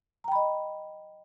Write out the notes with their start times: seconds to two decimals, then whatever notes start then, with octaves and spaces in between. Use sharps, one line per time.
0.24 A#5
0.28 G5
0.32 B5
0.36 D#5